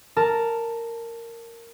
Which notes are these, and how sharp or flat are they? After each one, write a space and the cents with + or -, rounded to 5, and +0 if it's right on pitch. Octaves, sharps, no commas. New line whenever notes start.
A#4 -10 A5 +0